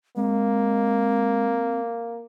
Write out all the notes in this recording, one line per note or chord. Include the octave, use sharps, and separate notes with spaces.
G#3 A#3 C4